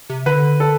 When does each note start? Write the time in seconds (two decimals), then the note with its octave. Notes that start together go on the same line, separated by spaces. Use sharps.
0.10 C3
0.26 D3 B4
0.60 A4